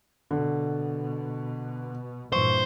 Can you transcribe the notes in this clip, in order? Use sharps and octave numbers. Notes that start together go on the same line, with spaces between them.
B2 D3
G2 A#2 E3 C5 C#6